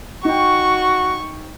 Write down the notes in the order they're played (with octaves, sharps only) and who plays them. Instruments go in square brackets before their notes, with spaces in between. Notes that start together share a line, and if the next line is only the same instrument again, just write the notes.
[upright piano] D#4 G5 [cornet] F#4 [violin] C#6